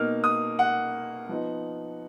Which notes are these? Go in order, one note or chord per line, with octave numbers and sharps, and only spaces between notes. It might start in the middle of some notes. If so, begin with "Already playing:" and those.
Already playing: B2 A#3 D#4 F6
D#6
F#5
F3 B3 D#4